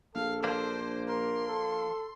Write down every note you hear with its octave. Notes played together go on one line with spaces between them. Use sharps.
A#1 A4 F5
F3 A#3 D4 C5
A#4 C6
A4